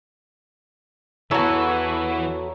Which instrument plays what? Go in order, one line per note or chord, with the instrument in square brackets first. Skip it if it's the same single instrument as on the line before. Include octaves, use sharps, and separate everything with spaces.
[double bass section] E2 B3 [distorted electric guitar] E3 [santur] E4 C#5 A#5 [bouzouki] F#4 A4